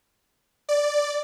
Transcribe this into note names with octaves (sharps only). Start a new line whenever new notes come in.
D5